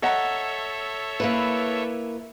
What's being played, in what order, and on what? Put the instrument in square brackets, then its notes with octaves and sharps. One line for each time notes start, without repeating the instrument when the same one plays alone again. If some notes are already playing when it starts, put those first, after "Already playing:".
[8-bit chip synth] A4 C#5 E5 [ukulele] D#5 F#5 A#5
[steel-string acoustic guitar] A#3 E4 B4